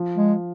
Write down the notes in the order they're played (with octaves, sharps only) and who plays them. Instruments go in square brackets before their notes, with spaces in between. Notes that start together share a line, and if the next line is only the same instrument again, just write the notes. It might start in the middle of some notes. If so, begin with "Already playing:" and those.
Already playing: [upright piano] F3
[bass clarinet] G#3